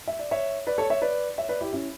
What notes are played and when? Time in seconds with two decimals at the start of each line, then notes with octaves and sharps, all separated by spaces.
0.08 E5
0.19 D5
0.31 C#5 E5
0.67 B4 D5
0.78 A4 C#5
0.90 C#5 E5
1.02 B4 D5
1.38 C#5 E5
1.49 B4 D5
1.61 E4 G4
1.73 C#4 E4